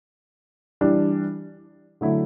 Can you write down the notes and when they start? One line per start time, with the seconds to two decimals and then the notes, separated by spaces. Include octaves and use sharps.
0.81 E3 G3 D4
2.01 D3 F#3 A3 E4